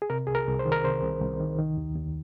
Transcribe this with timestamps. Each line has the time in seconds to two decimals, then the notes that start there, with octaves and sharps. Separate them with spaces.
0.02 G#4
0.10 C3 A#4
0.27 C2 G#4
0.35 A#4
0.47 C2
0.59 C5
0.65 D#3
0.72 A#4
0.84 C3 C5
1.03 C2
1.22 C2
1.40 D#3
1.58 D#3
1.77 D#2
1.96 D#2